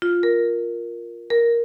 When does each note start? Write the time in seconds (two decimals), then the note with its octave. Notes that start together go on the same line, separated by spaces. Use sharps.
0.02 F4
0.23 A#4
1.30 A#4